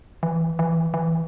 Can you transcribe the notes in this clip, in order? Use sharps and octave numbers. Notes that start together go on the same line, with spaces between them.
E3
E3
E3